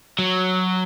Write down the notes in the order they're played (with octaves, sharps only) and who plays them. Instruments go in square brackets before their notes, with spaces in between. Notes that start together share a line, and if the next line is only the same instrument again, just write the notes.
[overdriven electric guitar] F#3